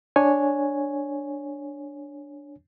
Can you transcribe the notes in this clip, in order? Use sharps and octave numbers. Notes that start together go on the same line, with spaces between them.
D4 C#5 G#5